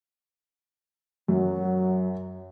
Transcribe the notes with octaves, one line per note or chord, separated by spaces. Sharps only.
F#2 F#3